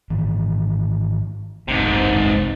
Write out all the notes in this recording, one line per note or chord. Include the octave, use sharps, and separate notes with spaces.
G#2 D#3 E3
F#1 C2 G#2 C3